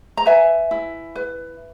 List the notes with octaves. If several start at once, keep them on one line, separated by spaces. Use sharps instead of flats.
A#5
B4 E5 G#5
E4
B4